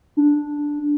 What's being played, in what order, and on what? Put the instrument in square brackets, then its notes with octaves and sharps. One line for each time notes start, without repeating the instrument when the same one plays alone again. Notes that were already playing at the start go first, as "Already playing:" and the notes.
[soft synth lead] D4